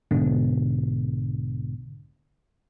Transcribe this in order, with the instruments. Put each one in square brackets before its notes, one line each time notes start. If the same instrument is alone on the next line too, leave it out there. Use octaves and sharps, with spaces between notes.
[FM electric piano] B1 G#2 B2 D3